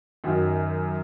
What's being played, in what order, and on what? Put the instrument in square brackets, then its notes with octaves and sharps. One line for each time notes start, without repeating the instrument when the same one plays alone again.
[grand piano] F#2 D#3 F#3